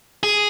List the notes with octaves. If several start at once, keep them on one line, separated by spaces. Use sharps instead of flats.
G#4